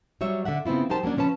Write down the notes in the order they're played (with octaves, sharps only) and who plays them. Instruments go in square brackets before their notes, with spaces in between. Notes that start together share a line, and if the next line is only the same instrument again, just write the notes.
[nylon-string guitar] F#3 G3 C#5 E5
D3 D4 E5 F#5
C#3 B3 C4 E4 F4
F#3 D#4 G4 A#4 C5 A5
F#3 A#3 C#4 D4
C#3 F3 C#4 B4 A5